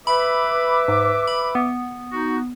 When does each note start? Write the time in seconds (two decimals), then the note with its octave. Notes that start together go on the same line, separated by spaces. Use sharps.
0.07 B4 E5 B5 D6
0.88 G#2
1.27 B5
1.55 B3
2.12 D#4 F#4